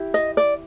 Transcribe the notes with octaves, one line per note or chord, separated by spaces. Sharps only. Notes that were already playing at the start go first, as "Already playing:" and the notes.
Already playing: E4 G4
D#5
D5